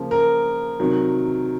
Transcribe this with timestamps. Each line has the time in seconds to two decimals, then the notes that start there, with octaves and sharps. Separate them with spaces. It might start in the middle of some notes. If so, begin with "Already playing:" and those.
Already playing: C#3 F3 A#3
0.11 A#4
0.80 C3 D#3 F#3